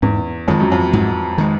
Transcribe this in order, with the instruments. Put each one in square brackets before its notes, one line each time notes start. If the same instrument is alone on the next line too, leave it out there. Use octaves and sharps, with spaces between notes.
[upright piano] E2 [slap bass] G#2
[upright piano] F2 [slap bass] D#3 G#3
[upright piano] F#2
F2
[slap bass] G#2
D#3 G#3